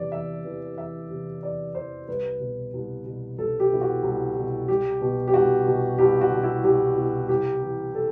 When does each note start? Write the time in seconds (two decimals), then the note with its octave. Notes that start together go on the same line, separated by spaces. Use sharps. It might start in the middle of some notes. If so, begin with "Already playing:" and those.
Already playing: E2 C3 E3 D5
0.12 E2 E5
0.45 C3 E3
0.77 E2 E5
1.10 C3 E3
1.43 E2 D5
1.75 C3 E3 C5
2.08 C2 B4
2.40 B2
2.74 C2
3.05 B2
3.38 C2 A4
3.60 G4
3.71 B2 E4
3.81 F#4
4.03 C2
4.36 B2
4.68 C2 G4
5.01 B2
5.28 G4
5.34 C2 F#4
5.67 B2
5.98 C2 G4
6.21 F#4
6.32 B2
6.43 E4
6.64 C2 G4
6.97 B2
7.29 C2 G4
7.61 C3 E3
7.95 A4